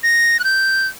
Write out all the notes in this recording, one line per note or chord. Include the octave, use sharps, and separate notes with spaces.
A#6
F#6
G6